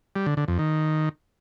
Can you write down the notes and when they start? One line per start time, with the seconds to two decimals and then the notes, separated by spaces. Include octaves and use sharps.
0.16 G3
0.26 D3
0.37 D3
0.48 F2
0.59 D#3